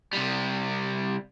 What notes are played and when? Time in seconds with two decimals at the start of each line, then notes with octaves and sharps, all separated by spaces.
0.13 C3 G3